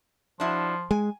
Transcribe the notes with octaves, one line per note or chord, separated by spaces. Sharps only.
F3 D4 E4 F#4
G#3 G#5